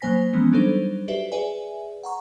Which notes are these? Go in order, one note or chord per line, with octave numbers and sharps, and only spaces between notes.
F#3 A#3 C5 G#5 A#6 B6
E3 F3 G#3 B3 C#4
F#3 G3 D4 D#4 A4 C5
F#4 G4 B4 D5 E5
G#4 B4 D5 E5 G#5
F#5 A#5 C#6